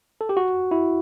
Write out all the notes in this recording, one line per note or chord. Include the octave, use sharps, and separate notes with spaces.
A4
G4
F#4
E4